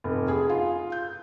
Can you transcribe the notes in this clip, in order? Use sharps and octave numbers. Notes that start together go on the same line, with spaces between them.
F1
G#4
F4
G6